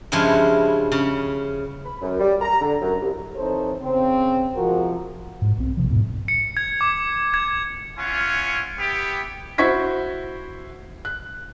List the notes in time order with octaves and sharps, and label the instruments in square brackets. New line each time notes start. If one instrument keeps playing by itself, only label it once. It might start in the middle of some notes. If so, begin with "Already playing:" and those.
[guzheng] G2 C#3 F3 G#3 E4
C#3
[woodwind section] B5
F#2
G3
A#5
D3
F#2
C2
[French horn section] E3 C4 D#4 A4 C5 C#5
C#3 C4
C3 F3 G#3 F#4 A#4
[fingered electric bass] G#2
B1 C4
A#1 C3 F3
F2 G#2 B2
[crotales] C#7
G#6
D6
G#6
[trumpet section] C#4 E4 F4 F#5 G#5
B3 E4 G4
[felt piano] E4 F#4 C5 C#6 G#6 B6
F#6